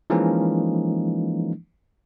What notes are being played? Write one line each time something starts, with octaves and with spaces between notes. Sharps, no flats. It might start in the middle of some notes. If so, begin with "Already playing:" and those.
E3 F3 G#3 A#3 C#4 D#4